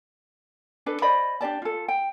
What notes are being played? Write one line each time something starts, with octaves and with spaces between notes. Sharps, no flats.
D4 A4 B4
C5 D5 D#5 B5
D4 G4 D5 A5
F4 A4
G5